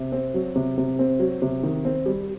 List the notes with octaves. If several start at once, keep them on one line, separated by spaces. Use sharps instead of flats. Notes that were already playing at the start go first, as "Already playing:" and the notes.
Already playing: C3
C4
F#3
C3
C3
C4
F#3
C3
D#3
C4
G3